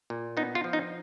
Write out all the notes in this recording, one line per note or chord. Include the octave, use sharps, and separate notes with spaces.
A#2
B3 D#4
F4
F3
D#4